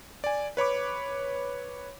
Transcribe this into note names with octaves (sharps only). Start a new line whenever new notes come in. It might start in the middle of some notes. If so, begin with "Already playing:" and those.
D5 G#5
B4 C#5 B5 D6